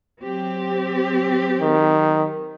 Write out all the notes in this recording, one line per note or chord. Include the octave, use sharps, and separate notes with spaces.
F#3 C4 G4
D#3